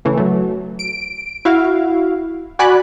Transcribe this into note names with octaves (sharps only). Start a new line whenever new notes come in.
C#3 E3 A3
F#3 A3
D7
E4 F#4 F5
F#4 D5 G#5 B5 F#6